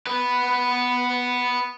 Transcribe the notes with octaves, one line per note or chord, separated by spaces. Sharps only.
B3 B4